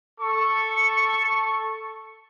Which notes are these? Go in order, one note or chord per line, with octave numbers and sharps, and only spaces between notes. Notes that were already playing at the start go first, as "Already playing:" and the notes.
A4 C#6